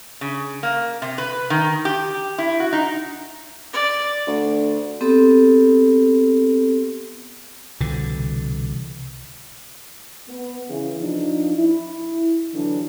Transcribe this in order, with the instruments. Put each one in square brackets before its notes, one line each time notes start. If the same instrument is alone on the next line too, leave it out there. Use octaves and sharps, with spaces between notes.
[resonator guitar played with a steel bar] C#3
A#3
C3
B4
D#3
G4
E4
F#4
D#4
[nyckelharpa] D5
[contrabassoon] D2
[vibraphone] B3 C4 G4 A4
[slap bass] C2 B2 D3 E3
[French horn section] B3
C#3 E3
F3 D4 D#4
E4
D3 E3 F#3 D4